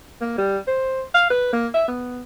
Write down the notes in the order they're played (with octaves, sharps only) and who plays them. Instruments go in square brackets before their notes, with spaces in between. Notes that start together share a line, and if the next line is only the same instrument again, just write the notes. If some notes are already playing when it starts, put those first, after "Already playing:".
[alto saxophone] A#3
G3
C5
F5
B4
A#3
E5
B3